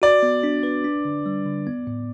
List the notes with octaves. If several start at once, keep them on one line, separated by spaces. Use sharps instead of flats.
F#4 D5
B3
D4
B4
D4
D3
G3
D3
B3
A2